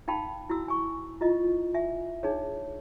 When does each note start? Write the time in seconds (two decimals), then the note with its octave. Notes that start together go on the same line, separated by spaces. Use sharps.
0.08 D#4 F5 G5 A5 B5
0.50 E4 F#4 E6
0.68 G#5 C#6
1.21 E4 F4 D#5
1.74 E5 G#5
2.23 D4 D#4 G#4 C#5